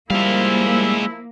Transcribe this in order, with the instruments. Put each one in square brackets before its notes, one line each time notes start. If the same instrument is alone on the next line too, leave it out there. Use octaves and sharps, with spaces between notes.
[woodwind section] F3 E4 [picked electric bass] G3 [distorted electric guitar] G#3 F5 [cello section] A#3